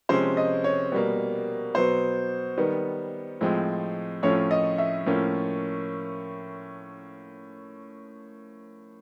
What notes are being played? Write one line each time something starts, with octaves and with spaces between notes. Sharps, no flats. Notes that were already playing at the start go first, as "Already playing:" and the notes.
C3 F3 G#3 C#4 C5
D#5
C#5
B2 G3 A#3
B2 F#3 B3 C5
D#3 G3 B3
A2 F3 G#3 C4
A2 F3 A3 C#4 C#5
D#5
E5
A2 F3 A#3 C#4